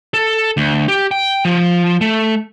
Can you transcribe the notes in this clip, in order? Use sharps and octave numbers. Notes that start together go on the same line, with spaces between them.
A4
D2
G4
G5
F3
A3